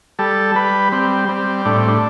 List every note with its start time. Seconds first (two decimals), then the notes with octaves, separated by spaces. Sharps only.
0.19 G3 A4
0.55 G3 B4
0.92 G3 C4
1.28 G3 C4
1.65 A2 D4
1.77 C4
1.88 D4